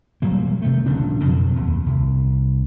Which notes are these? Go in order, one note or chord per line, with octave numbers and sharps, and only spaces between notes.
E1 F#3 G3 A#3
C3 D#3 A3
D#1 A#1 C#3 D4
F2 B2 F#3 C4
D#2
C2